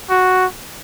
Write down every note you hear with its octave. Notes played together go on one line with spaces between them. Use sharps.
F#4